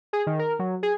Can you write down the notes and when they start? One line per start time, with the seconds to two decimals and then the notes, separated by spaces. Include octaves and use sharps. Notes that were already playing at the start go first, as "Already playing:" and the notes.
0.13 G#4
0.27 D#3
0.39 A#4
0.59 F#3
0.83 G#4